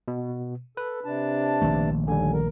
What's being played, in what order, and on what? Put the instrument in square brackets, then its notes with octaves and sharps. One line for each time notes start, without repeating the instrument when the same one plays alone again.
[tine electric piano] B2
[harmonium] A4 [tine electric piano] B4
[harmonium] C3 D4 A5
[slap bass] A#1 D#3 A3
[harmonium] D#2 G#5 [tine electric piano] D3 G3
[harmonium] A#4